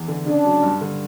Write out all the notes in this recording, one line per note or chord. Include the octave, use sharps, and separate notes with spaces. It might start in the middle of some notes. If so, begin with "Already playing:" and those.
Already playing: E2 E3
D3
C#3 D4
F#3
G2
D3